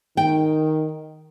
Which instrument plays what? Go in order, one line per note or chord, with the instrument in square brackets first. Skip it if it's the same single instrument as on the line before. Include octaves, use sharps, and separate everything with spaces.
[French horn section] D#3 [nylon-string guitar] G5